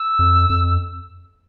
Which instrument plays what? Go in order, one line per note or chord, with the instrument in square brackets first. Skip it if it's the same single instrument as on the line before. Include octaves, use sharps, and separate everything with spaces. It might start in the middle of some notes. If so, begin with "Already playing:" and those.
Already playing: [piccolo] E6
[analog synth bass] F2
F2